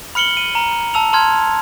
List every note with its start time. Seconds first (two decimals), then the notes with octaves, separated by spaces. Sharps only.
0.15 B5 F6 C#7 F#7 G7
0.37 D#7
0.55 A#5
0.94 A5 E6 F7
1.13 A5 C6 F6 G#6